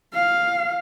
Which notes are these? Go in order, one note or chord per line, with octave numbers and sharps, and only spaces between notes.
F5